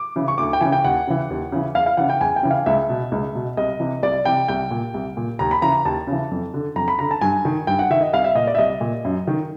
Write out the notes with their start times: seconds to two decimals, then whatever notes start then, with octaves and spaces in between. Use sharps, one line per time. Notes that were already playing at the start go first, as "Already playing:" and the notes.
Already playing: D6
0.16 C#3 E3
0.28 C#6
0.38 D2 D6
0.53 G5
0.61 C#3 E3 G#5
0.72 G5
0.85 D#2 F#5
1.07 C#3 E3
1.30 D#2
1.52 C#3 E3
1.75 E2 F5
1.86 F5
1.97 C#3 E3 F#5
2.10 G5
2.21 E2 G#5
2.36 G5
2.43 C#3 E3
2.51 F5
2.66 C#2 E5
2.90 B2
3.12 C#2
3.35 B2
3.57 C2 D#5
3.80 C3 E3
4.03 C2 D5
4.25 C3 E3 G5
4.48 C2 G5
4.71 A#2
4.94 C2
5.17 A#2
5.39 D#2 A#5
5.51 B5
5.62 C#3 E3 A#5
5.85 D#2 A5
6.07 C#3
6.12 E3
6.31 F2
6.54 D3
6.76 F2 A#5
6.88 B5
6.99 D3 A#5
7.11 A5
7.21 G2 G#5
7.45 D#3
7.67 G2 G5
7.79 F#5
7.90 D#3 E5
8.01 D#5
8.13 C2 F5
8.24 E5
8.35 A#2 D#5
8.47 D5
8.55 E5
8.58 C2 D#5
8.81 A#2
9.05 F#2
9.27 D#3